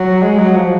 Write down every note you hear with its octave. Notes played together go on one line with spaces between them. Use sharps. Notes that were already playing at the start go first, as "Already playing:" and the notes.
Already playing: F#3
G#3
F#3
F3